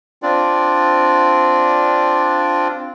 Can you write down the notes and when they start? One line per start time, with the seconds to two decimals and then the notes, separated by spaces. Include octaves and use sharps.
0.22 C4 D4 F4 D5